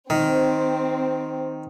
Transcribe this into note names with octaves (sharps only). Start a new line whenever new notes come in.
D#3 C4